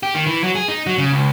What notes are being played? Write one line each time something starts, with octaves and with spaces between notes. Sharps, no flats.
G4
D#3
E3
F#3
G#4
D#4
F#3
C#3
C#2